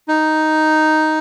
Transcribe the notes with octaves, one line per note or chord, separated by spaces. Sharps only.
D#4